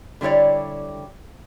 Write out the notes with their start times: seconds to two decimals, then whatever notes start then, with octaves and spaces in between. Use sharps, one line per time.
0.21 D3 G3 E4 C#5 D5